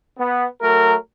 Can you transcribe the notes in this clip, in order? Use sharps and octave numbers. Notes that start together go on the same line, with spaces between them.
B3
F#3 A3 A#4